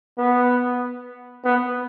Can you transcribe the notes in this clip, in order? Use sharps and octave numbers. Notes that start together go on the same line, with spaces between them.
B3
B3